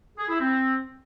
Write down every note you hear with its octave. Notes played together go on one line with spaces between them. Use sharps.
G#4
E4
C4